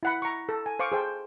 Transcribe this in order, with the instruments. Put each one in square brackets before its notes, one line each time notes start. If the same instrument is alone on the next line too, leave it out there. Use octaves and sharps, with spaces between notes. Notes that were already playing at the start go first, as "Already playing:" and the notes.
[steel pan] E4 F#5 B5
A#5 C#6
A4
G#5
C5 F5 C#6 D6
G#4 C5 G5 A5